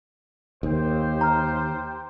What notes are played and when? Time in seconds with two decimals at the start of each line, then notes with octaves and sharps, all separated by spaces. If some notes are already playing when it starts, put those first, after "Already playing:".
0.63 D#2 G4 C5 G5
1.21 A#5 F6